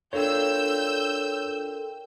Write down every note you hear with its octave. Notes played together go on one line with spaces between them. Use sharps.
D4 F4 A4 A#4 C#5 G5 E6 G6